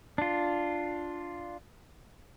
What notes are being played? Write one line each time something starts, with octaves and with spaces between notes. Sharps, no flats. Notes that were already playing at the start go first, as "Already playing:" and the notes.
D4 F4